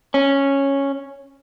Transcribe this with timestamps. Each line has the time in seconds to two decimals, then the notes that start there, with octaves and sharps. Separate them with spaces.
0.14 C#4